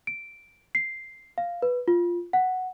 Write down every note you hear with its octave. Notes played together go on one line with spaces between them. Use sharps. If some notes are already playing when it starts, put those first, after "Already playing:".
D7
C7
F5
B4
F4
F#5